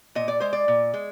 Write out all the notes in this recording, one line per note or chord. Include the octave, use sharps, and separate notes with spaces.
A#2 D#5
D5
G#3 C5
D5
A#2
G#3